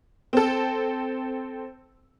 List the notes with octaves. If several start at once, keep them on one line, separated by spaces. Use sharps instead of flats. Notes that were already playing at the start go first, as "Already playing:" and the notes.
C4 A4